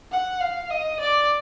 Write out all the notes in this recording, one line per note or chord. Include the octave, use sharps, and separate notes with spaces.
F#5
F5
D#5
D5